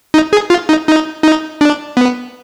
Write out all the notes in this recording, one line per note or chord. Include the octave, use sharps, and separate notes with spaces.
D#4
G#4
F4
D#4
D#4
D#4
D4
B3